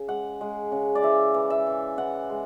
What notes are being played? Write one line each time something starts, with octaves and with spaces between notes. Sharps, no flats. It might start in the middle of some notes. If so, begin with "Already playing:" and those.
Already playing: C#3
G#3 F#5
G#3
C#3
D5
E3 E5
E3
E5
E3
E3 F#5
G#3